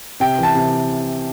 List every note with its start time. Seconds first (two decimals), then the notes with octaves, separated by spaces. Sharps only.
0.20 C3 G5
0.39 E3 A5
0.55 C3